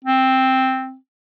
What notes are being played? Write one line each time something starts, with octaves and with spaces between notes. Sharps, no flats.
C4